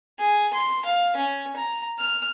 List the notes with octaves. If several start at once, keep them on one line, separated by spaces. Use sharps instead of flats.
G#4
C6
F5
C#4
A#5
F6